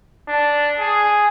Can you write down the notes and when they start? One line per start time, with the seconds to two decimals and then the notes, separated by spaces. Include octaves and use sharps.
0.28 D4
0.79 G#4